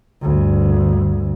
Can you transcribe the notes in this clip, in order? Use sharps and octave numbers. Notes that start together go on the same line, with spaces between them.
D2 G2